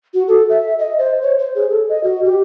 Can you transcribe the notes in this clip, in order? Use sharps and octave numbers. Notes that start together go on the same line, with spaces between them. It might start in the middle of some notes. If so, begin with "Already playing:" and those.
F#4
A4
E5
D#5
C5
C#5
C5
G#4
A4
D#5
F#4
G4